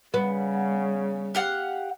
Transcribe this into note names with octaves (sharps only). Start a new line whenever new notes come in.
C#3 G3 B3
G4 F5 F#5